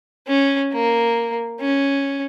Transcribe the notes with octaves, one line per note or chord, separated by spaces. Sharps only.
C#4
A#3
C#4